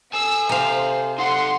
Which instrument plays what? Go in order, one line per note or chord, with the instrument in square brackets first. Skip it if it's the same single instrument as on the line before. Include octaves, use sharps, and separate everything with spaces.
[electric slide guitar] A4 G#5 [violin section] E6
[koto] C3 F5 [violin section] C5
[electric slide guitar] D#4 A4 [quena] F#5 [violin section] C6